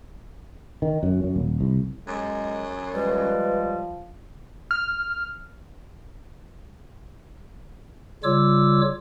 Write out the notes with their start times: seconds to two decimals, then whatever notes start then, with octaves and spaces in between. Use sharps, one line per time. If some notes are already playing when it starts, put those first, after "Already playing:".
0.82 D#3
1.03 F#2
1.24 F#2
1.36 D#1
1.61 C2
2.08 F#2 G#3
2.94 F3 G3 G#3 B4
4.71 F6
8.24 C#3 G3 F4 C#5 D6 E6